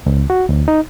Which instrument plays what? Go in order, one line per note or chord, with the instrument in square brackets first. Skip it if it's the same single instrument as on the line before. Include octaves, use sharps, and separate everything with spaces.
[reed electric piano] C#2
F#4
D2
D#4